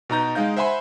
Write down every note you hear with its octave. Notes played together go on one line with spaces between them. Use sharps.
B2 D#4 A#5 G6
G#3 D#4 F5 G6
C5 E5 F#5 G#5 B5 C6